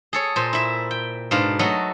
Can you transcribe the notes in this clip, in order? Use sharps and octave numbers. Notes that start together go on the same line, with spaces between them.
G#4 A4 C#5
A#2 C5
E4 E5
G5
G#2 B2 D4 F5
F#3 A3 F#4 A4 D#5